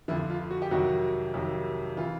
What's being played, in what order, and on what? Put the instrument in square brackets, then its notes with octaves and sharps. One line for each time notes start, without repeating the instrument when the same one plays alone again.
[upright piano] F2 D3 F3 E4
F4
F#4
G4
F2 C3 D#3 F#3 F#4
F2 C3 D#3 F#3
E3 F4